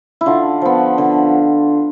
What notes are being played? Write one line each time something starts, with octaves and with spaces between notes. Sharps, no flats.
E4
D3 F4
F3 B3
D3